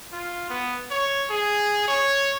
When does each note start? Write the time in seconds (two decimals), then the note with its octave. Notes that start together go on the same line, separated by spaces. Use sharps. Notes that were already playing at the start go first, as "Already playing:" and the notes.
0.12 F4
0.50 B3
0.90 C#5
1.30 G#4
1.88 C#5